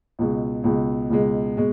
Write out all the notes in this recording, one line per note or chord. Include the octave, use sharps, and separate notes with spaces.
C#2 B2 G#3
C#2 B2 G#3
C#2 B2 G#3
B2 G#3